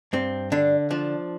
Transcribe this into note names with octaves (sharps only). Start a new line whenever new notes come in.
G2 C4
D3 D4
F3 D4